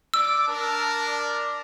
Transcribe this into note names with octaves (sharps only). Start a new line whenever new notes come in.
D5 D6 E6
D4 A#4 A5
D5